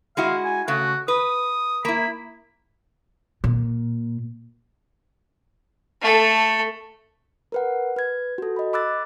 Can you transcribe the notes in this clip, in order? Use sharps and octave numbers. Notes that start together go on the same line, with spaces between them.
G#3 E4 F#4 F5
G#5
C#3 A3 F#4
B4 D#6
A#3 E4 B5
A#2
A3 A4
A#4 B4 F#5
B4 G#6
F#4 A4
D#5 B5
B5 D6 E6 F#6 A6